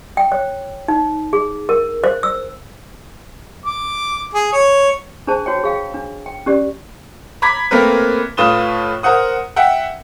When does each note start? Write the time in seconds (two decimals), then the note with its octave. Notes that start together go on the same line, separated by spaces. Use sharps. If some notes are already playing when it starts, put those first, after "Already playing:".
0.17 G5
0.32 C#5
0.88 D#4
1.33 G#4
1.69 A#4
2.04 C5
2.23 E6
3.65 D6
4.34 G#4
4.52 C#5
5.27 D4 G#4 C5 A5
5.46 F#4 C#5 G5
5.64 G#4 F5 G5
5.94 D4
6.26 G5
6.46 C#4 G4 D5
7.42 A#5 B5 D6 G#6 B6
7.71 A3 A#3 C4 A#4 B4
8.37 A2 F4 B4 D#6 E7 G7
9.03 A#4 C5 F#5 D#6
9.56 E5 F#5 G5